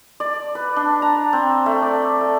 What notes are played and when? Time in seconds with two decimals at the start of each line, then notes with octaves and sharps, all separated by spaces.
0.20 D5
0.55 B4
0.76 D4
1.02 A#5
1.33 C4
1.66 A3
1.82 D5
2.21 A3